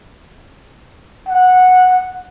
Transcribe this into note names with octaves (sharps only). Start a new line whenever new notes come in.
F#5